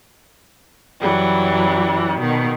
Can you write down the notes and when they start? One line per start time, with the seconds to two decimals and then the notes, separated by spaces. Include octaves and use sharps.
1.01 F#2 E3 F#3 G3
2.19 B2 D#3